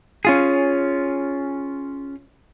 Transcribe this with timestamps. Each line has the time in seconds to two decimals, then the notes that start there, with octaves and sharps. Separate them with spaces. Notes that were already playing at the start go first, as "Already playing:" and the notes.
0.25 C#4 F4 G#4